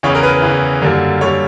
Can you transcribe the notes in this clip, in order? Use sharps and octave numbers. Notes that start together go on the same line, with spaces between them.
E2 C#3 E3 C#5
A#4
B4
E2 C#3 E3
F#2 D3 G3 A#3
D3 G3 A#3 C#5